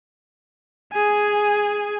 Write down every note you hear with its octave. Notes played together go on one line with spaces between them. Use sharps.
G#4 G#5